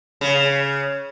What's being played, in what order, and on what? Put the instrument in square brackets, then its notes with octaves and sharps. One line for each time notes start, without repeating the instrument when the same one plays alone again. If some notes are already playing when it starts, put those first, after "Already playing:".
[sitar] C#3